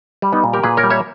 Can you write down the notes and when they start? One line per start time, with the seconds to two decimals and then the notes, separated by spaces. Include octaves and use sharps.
0.22 G3
0.32 B3 D#4
0.44 A#2
0.53 G4 A#4
0.63 A#2 G#4 B4
0.77 A#4 C#5
0.84 G3
0.90 C#5 E5